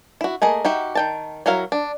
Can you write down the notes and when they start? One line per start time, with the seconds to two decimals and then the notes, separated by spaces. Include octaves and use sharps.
0.21 E4 F#4
0.42 A3 A#3 G#4 D#5
0.65 D#4 F#4 G4 E5
0.95 D#3 G5 A5
1.46 F#3 E4 F#4 A#4 F5
1.72 D4